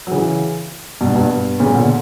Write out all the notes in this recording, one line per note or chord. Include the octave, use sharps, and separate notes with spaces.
F#3
C#3 E3
G2 B2
G2 B2
A#2 C#3
B2 D3